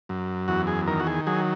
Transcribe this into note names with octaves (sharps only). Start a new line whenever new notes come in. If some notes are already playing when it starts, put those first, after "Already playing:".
F#2
E2 F#4
G#4
D#3 A#4
F#4
G#4
F#3 G#4